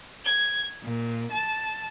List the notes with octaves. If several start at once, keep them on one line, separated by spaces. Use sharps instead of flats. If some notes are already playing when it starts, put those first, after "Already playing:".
G#6
A#2
A5